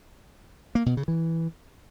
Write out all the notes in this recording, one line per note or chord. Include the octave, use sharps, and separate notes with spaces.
A#3
B2
C#3
E3